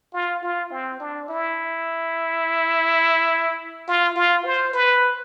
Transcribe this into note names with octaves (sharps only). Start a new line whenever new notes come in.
F4
F4
C4
D4
E4
F4
F4
C5
B4